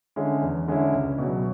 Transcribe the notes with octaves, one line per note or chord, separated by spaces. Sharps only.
D3 G#3 C#4 E4
E2
D3 G#3 C#4 E4
C#2
B2 F#3